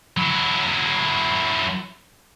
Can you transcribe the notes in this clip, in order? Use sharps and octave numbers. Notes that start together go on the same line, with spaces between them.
F#3 E4